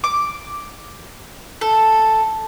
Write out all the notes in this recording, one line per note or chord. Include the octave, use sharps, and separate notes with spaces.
D6
A4